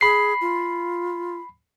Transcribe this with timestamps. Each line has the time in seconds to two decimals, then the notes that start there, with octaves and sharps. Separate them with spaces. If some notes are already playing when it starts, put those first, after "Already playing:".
0.01 G#4 B5 C7
0.41 F4